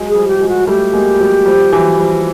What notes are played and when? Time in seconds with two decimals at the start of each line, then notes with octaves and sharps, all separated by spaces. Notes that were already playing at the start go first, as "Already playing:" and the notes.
Already playing: F#3 G#3
0.09 G#4
0.15 F3 G3
0.28 G4
0.41 F#3 G#3
0.48 F#4
0.67 G3 A3 G4
0.93 G#3 A#3
1.20 F#3 G#3
1.46 F3 G3
1.72 E3 F#3
1.98 F3 G3